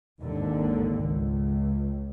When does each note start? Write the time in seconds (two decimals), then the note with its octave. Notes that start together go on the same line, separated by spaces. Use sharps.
0.21 G#1 D#2 D3
1.02 C#2